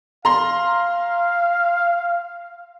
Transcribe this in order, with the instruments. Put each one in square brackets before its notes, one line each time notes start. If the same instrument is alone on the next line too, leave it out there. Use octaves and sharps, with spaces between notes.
[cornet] F5 [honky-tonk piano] A#5 C6